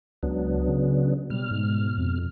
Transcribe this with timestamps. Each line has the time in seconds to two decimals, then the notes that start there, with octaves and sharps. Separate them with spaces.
0.23 C#2 F#3 B3 D4
0.68 C#3
1.30 B2 G3 F6
1.51 G#2
1.98 F2